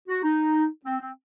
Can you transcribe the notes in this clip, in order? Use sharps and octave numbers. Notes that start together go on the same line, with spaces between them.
F#4
D#4
C4
C4